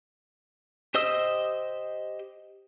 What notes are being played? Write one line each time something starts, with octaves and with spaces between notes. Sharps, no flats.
G4 C5 D#5 D#6 E6